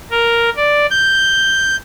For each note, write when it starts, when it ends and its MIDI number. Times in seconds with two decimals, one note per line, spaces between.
0.11 0.49 70
0.56 0.86 74
0.90 1.76 91